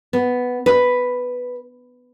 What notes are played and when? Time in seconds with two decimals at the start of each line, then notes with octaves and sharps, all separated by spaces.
0.13 B3
0.66 B4